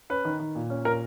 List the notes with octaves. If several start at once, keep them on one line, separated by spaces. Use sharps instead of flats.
C#4 B4
D#3
D#3
A#2
C#4
A#2 A#4